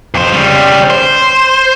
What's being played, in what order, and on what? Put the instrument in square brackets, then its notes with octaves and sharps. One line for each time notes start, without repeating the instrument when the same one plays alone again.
[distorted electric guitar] F2 C5
C#3 G3
C5